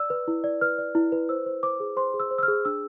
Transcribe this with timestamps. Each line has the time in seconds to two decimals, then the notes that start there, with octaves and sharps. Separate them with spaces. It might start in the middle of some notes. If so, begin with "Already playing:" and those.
Already playing: D5 E6
0.10 B4
0.28 E4
0.44 D5
0.61 B4 F6
0.78 D5
0.95 E4
1.12 B4
1.29 C5 E6
1.46 C5
1.63 C5 D6
1.80 G#4
1.97 C5 C6
2.14 G#4
2.20 E6
2.31 C5
2.38 E6
2.43 F6
2.48 G#4
2.65 D4 E6